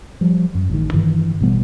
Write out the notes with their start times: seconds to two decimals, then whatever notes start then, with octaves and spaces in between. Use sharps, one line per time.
0.21 F3 G3
0.55 F#2
0.69 A1 D#3
0.93 G2 D#3 E3
1.41 A1 B2 G3 B3